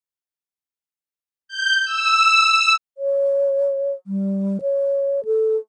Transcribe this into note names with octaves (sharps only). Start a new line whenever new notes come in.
G6
E6
C#5
G3
C#5
A4